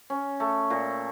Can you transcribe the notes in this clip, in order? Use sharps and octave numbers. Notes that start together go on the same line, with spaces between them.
C#4
A3
A#2